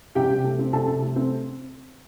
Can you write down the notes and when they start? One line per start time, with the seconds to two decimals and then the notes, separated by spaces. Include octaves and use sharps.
0.15 C3 G4 G5
0.30 C3
0.44 A3
0.59 C4
0.73 C3 A4 A5
0.87 C3
1.02 A3
1.16 C4